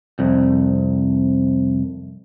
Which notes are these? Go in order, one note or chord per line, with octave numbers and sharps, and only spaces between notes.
C2 F2